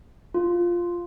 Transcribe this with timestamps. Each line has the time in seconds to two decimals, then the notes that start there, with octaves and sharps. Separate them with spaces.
0.34 F4